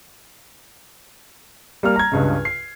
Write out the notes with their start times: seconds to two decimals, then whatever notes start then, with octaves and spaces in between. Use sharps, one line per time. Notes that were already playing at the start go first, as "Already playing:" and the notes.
1.83 G3 A#3 F6
1.96 A#5 G#6
2.12 C#2 G2 C#3
2.45 C7